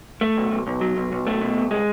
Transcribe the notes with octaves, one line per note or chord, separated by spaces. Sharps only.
A3
B1
B1
B1
F#3
B1
B1
A3
B2
C2
G#3